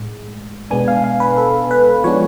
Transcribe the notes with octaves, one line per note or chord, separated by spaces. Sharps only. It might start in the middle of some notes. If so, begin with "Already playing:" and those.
Already playing: A2 G#3
B2 G#3 B3 D4 G#5
F5
F5
B4
A4
B4
F3 G#3 B3 D4 C#5